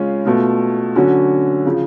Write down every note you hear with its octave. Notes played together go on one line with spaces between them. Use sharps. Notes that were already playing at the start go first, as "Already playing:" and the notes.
Already playing: C#3 G#3 C#4 F4
B2 A3 F4
D3 F#3 C#4 F#4
C#3 F3